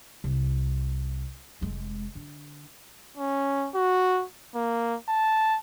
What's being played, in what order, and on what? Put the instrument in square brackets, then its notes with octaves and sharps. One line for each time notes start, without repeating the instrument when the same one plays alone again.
[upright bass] C2
F1 G#3
D3
[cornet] C#4
F#4
A#3
A5